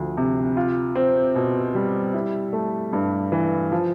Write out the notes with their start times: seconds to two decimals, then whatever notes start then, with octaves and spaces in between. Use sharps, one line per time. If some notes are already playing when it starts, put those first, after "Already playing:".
Already playing: D2 F3
0.17 C3
0.57 F4
0.96 C4
1.35 B2
1.75 G3
2.14 E4
2.53 A3
2.93 G2
3.32 E3
3.72 F3